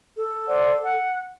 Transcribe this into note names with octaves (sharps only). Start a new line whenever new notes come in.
A4
C5 D5 F#5
F#5